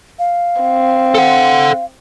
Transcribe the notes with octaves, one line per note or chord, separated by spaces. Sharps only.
F5
C4
A4 F#5